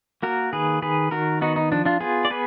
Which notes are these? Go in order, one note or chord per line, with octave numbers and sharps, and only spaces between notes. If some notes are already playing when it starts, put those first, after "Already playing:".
A#3 F#4 A#4
D#3 G#4 B4
D#3 G#4 B4
D#3 F#4 A#4
B3 D#4 F#4
D#4
F3 D4
D4 F4
B3 F4 G#4
D5
B3 G#4 B4